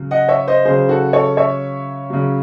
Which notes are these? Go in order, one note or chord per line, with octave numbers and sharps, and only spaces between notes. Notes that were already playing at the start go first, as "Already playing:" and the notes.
Already playing: C#3 F#3
D#5 F#5
C#5 E5
C5 D#5
C#3 F#3 G#4 C5
F#4 A4
A4 C#5
C#5 E5
C#3 F#3